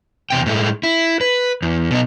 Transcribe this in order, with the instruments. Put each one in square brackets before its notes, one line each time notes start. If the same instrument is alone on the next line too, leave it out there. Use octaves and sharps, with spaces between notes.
[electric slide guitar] E2 C3 G5
A2 G#3 A3
E4
B4
E2
B2 D#4